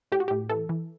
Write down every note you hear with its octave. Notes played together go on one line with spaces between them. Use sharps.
A2 G4
F#4
A2 G4
E3 A4
E3